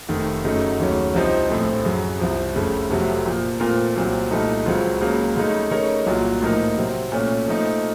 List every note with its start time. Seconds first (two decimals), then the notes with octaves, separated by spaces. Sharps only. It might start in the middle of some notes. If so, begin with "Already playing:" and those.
0.09 F1 F2 D#3 A3
0.44 F#2 C#3 F#3 A3 D#4
0.79 D#2 C#3 F#3 A3 C#4
1.14 C2 C3 F3 C4 D#4
1.50 A#1 A2 A3 C4
1.85 F#2 C#3 F#3
2.20 C2 C3 F3
2.55 F1 F2 C#3 A3
2.90 F1 F2 C3 F#3 A3
3.26 A#2 F3 A#3
3.60 A#2 A3 C4 F4 A#4
3.96 C2 A#2 F#3 C4
4.31 C2 A#2 A3 D#4 A4
4.66 C#2 C#3 F#3 C4 F4
5.01 C#2 C#3 F#3 A#3
5.36 C#2 C#3 A3 D#4
5.71 C#3 A3 D#4 A#4 C#5
6.06 C2 A#2 F#3 A#3 F4
6.41 A2 F3 A#3 D#4 A#4
6.77 C3 F#3 C4
7.12 A#2 A3 C#4
7.46 A#2 F3 A3 D#4